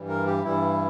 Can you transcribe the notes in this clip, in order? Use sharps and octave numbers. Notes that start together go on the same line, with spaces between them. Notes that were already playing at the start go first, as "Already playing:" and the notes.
Already playing: G2 E3 G3
A#4
G4
G2 E3 G3 E4